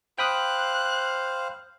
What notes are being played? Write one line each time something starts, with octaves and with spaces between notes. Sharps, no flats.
C5 F5 G5 B5 D#6 F#6